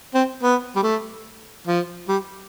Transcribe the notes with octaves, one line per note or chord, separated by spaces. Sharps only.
C4
B3
G3
A3
F3
G3